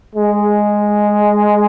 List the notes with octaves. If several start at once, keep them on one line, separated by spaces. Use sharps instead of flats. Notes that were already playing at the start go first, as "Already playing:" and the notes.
G#3